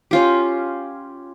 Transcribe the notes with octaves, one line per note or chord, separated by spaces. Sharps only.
C#4 F4 G4